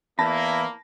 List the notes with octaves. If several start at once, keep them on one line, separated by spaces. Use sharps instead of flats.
E2 A#3 E4 A5 B5 A#6